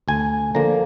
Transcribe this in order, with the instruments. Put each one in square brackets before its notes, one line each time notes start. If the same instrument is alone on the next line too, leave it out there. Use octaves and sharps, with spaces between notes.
[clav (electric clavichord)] D2 G#5
D3 F3 A#3 A#5